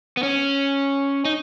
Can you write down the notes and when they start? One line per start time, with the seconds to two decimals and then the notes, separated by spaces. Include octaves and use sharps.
0.17 B3
0.23 C#4
1.25 D#4